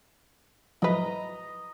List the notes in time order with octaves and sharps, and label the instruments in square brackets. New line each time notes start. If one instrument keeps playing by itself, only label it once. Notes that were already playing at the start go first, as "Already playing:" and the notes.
[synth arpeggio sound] G#2 F3 F#3 [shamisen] E4 B4 [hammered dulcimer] D#5 A#5